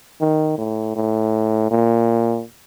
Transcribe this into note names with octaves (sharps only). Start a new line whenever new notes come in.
D#3
A2
A2
A#2